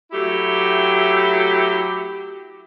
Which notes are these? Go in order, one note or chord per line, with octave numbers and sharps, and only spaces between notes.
F#3 A3 E4 G4